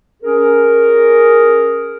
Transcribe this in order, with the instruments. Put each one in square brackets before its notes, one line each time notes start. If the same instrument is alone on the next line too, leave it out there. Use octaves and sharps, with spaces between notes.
[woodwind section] C#4 G#4 A#4